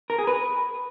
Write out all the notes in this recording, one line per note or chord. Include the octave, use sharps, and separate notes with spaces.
A#4
G#4
B4